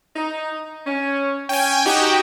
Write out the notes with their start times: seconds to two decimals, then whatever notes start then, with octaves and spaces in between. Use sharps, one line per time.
0.16 D#4
0.86 C#4
1.49 C#4 G5 G#5
1.86 D#4 F#4 G4 G5